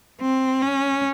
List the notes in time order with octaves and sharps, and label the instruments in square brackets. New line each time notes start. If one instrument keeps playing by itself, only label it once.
[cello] C4
C#4